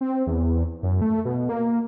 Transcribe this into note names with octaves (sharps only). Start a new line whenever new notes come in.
C4
E2
F#2
A3
B2
A#3